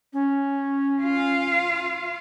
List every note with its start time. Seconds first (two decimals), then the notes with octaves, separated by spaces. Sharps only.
0.13 C#4
1.02 F4 F5